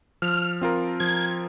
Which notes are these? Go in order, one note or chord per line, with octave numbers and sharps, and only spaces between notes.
F3 F6
C4 F4 A#4
F3 G#6